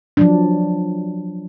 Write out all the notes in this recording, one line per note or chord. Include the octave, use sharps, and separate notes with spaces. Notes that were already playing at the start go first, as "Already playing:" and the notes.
F3 F#3 D4